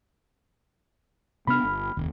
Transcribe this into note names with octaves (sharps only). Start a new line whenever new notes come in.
C3 B3 D4 B5 F6
G1
F1 D#2